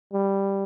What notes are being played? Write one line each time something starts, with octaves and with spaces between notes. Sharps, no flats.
G3